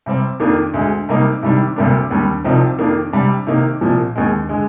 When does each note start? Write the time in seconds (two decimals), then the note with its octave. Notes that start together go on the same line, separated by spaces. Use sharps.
0.06 C3 G3 C4
0.40 F2 D#3 A#3 D4
0.74 D2 D3 G#3
1.09 C3 G3 A#3 D#4
1.43 C3 D#3 G3 D4
1.76 D2 C3 G3 A#3 D4
2.11 D#2 D3 G3
2.44 C2 C3 F3 C4 D#4
2.79 F2 D#3 A#3 D4
3.13 C3 G3 D4
3.47 C3 D#3 A#3 D#4
3.81 C2 A#2 F3
4.16 D#2 D3 G#3
4.49 D3 G#3